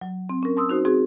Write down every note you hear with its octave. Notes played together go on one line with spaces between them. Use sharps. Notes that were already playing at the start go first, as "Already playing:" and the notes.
F#3
C4
C#4 A#4
A5 C6 D#6 E6
D#4 F#4 C5
C4 F#4 G#4